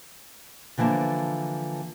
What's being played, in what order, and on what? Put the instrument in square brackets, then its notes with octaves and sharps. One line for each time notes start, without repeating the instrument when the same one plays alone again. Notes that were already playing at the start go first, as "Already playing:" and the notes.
[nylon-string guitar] D3 E3 F3 A#3 A5